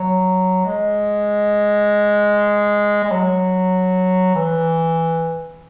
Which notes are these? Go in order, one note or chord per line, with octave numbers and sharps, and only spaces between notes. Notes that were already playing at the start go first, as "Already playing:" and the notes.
Already playing: F#3
G#3
G#3
F#3
E3